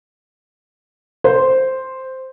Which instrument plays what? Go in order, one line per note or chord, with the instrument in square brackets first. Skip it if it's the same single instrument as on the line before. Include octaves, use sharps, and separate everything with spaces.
[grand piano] C5